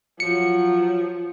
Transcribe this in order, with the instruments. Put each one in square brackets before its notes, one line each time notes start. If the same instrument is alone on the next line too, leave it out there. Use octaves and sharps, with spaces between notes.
[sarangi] F3 [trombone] F#3 [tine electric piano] C#7